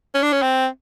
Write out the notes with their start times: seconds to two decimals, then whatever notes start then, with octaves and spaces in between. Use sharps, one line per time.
0.14 C#4
0.23 D4
0.33 C#4
0.42 C4